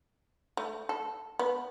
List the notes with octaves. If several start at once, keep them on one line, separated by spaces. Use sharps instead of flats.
A3
A4
B3